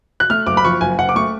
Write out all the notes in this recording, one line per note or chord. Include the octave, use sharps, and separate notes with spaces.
F#6
A3 F6
F#1 D6
B5
F3 C#6
F#1 G#5
F#1 F#5
D6
A3 C#6